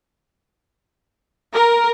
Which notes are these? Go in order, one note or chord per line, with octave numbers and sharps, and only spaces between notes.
A#4